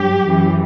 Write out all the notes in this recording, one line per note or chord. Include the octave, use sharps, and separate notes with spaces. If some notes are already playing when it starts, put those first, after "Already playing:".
Already playing: G2 F#3 G4
F#2 E3